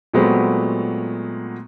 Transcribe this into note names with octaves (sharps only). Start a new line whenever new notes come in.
A#2 F#3 G#3 A3 B3 C4